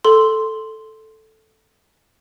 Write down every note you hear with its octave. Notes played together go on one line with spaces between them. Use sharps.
A4 C6